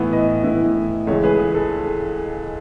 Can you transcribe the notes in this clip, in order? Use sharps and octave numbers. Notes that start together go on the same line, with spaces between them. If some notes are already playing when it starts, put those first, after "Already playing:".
Already playing: A2 E3 B3 E4
B4 D#5
A2 E3 B3 E4
C#2 C#3 E3 A4 C#5
G#4 B4
G#4
A4